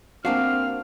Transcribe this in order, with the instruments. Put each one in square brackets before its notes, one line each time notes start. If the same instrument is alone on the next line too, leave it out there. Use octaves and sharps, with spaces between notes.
[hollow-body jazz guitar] A#3 D4 F#4 [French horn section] C4 [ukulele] F5 [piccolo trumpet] F6